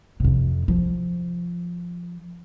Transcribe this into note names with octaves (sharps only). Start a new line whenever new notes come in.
F2 C3
F3